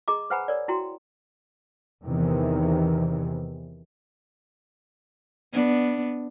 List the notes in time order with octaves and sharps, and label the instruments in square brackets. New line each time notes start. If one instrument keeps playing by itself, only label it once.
[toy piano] G#4 D#5 A#5 D6
B4 C5 F#5 G#5 A#5 B5
A#4 C#5 D5
E4 F#4 G5 A#5 C6
[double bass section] E2 C3 D#3 E3
[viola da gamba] B3 D4